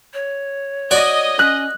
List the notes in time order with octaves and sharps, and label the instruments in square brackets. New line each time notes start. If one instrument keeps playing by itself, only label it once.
[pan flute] C#5
[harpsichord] F#4 D5 [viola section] D#5
[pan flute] C#4 [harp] F#6